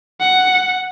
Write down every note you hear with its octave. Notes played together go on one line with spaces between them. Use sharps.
F#5